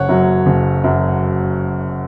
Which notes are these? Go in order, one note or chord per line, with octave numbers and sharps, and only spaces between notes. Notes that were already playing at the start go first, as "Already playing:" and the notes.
Already playing: F#1 C#5 F#5
F#2 F#3
F#1
F#2 F#3